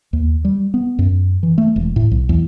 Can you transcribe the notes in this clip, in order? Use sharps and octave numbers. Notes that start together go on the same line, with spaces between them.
D#2
G3
B3
F#2
E3
A3
E1
A2
B1
E2